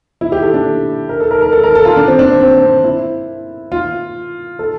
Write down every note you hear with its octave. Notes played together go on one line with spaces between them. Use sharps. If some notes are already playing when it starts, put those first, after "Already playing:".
E4
G4
A4
D4
A#4
A4
A#4
A#4
A4
A#4
A4
F4
D4
C4
D4
C4
C4
C4
E4
F4
A4